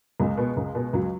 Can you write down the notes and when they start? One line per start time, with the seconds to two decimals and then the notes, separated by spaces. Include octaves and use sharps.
0.20 C#2 G#3
0.37 B2
0.57 C#2
0.75 B2
0.93 C#2 F#3